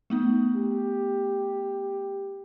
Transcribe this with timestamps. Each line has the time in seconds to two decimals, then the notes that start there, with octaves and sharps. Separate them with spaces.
0.10 A3 B3 D#4
0.55 G4